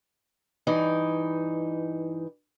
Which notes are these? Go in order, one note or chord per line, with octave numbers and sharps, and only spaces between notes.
G2 E3 D#4